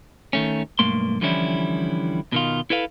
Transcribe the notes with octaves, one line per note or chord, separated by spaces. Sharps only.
D#3 A3 C#4
B1 G2 A3 A#3 C6
D3 E3 F3 G3 C#4 E4
B2 D#3 F4
E4 A4 B4 F5